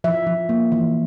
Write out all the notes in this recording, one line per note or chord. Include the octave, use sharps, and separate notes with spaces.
F3 E5
F3
A#3
E3